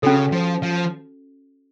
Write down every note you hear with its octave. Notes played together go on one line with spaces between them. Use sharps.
C#3 C#4 F#4 A4
F3
F3